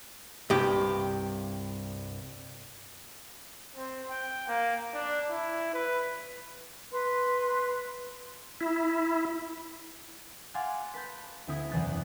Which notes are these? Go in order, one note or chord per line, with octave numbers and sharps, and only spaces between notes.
C2 G2 G4
C4
G5
A#3
D4
E4
B4
B4 C6
E4
F5 F#5 G#5 C6 D6 A6
B4 A5 G6
D2 C4 E4 D#6 G#6
F#1 E2 C3 E3 F#6 A6